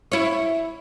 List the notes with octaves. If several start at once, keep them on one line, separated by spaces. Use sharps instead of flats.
E4 C#5